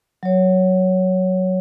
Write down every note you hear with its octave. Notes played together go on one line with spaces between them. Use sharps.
F#3 C#5